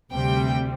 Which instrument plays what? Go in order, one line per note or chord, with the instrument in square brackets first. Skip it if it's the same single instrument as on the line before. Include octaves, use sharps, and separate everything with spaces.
[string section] D2 C3 G3 G5